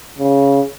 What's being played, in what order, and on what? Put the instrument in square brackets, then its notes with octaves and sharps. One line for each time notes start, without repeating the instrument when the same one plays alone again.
[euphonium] C#3